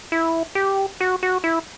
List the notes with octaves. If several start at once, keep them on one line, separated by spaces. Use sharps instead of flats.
E4
G4
F#4
F#4
E4